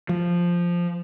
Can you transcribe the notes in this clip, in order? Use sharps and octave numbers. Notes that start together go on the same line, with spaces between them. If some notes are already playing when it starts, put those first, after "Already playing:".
F3